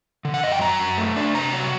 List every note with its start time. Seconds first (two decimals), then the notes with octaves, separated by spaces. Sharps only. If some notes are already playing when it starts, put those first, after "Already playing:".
0.25 D3
0.34 F#5
0.43 F#2 D#5
0.52 G5
0.61 F#3 A#5
0.79 F#2
0.98 A3
1.16 D4
1.35 C3 A#5
1.53 F#3